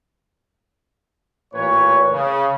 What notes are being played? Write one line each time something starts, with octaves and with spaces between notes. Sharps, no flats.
A1 A#2 B4 C#5
C#3